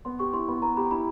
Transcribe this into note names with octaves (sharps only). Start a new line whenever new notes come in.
B3 C6
G4 C#6
E4 C6
B3 B5
B3 A#5
G4 B5
E4 B5